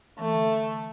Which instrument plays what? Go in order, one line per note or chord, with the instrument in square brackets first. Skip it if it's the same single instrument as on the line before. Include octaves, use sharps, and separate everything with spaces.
[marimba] E3 [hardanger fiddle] A3
[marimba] D3
D3